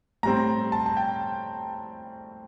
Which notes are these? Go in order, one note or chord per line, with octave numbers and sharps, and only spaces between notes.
A2 G3 C4 A#5
A5
A5
G5